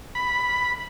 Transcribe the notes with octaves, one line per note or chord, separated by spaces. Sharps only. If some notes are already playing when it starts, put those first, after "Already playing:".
B5